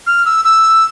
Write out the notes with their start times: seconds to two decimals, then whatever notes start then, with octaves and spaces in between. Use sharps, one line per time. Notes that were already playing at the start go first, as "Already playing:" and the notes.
0.07 F6
0.25 E6
0.44 E6